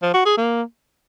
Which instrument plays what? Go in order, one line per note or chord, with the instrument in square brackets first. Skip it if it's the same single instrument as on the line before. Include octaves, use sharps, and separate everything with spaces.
[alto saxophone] F3
F#4
G#4
A#3